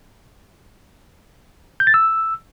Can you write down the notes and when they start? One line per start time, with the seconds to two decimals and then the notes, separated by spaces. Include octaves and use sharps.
1.80 G6
1.87 A6
1.94 E6